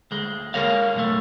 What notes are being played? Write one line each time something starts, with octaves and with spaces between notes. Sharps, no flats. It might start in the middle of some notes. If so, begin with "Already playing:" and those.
D2 G#3
G#3 A#4 C#5 F5
B1 E2 A2 A3